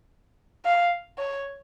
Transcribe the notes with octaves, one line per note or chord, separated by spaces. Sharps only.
F5
C#5